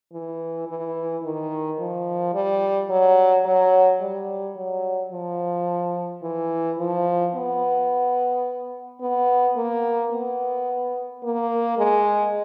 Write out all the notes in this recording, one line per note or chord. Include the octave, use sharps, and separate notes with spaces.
E3
E3
D#3
F3
G3
F#3
F#3
G3
F#3
F3
E3
F3
B3
B3
A#3
B3
A#3
G#3